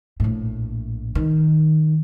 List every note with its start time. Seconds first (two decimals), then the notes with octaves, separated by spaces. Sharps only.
0.20 A#1 A2
1.15 D#3